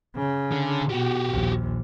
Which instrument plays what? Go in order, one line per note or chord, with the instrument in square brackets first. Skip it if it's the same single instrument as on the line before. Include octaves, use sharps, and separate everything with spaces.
[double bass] C#3
[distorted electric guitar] D3
[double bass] B2 [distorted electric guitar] F#4 G4
[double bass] A#1 D#2